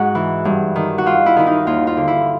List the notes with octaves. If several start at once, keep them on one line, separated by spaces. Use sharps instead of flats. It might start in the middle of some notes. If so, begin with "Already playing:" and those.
Already playing: G#2 F#4
E3
G2
D#3
F#4
G2 F4
E4
D#3 E4
D#4
D#2 F4
F4
D3
E4